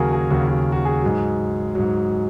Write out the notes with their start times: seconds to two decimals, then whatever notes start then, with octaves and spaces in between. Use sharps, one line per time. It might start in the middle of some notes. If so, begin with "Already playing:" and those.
Already playing: D#2 C#3 F#3 F#4 G#4 A#4
0.12 G#4
0.30 D#2 C#3 F#3 F#4
0.48 F#4
0.72 F#4
0.85 G#4
1.02 G#2 F#3
1.75 G#2 F#3